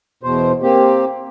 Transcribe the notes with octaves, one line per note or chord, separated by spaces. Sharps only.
E2 B2 C5
A#3 C4 G4